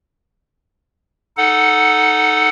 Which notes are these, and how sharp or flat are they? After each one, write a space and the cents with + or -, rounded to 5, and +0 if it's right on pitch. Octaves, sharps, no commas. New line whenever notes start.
D#4 +0 A4 +0 F#5 +0